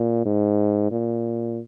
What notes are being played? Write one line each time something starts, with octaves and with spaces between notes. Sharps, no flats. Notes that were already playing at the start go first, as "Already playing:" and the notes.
Already playing: A#2
G#2
A#2